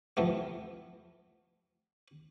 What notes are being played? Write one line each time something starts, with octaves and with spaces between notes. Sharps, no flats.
C2 F2 C3 A3 B3